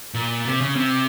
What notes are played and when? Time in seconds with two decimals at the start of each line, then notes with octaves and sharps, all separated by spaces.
0.14 A#2
0.45 C3
0.61 C#3
0.76 C3